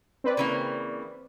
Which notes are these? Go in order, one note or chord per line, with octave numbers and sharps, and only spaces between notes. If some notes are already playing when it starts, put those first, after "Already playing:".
C4 B4 D5
C#3 E3 A#3